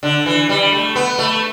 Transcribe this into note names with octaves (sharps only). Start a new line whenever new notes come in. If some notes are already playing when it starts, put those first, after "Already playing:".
D3
E3
G3
A3
B3
A3